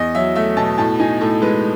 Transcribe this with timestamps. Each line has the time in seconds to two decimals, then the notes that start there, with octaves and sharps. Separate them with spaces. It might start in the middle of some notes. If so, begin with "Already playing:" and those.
Already playing: E2 D#5
0.15 F#3 E5
0.36 A3 E5
0.57 B2 A5
0.78 A2 A5
1.00 D#4 G#5
1.21 A2 A4
1.42 G#3 B4